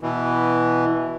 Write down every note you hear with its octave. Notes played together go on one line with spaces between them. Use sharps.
B2 E3